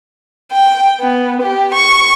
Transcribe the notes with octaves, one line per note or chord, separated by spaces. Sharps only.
G5
B3
G4
C#6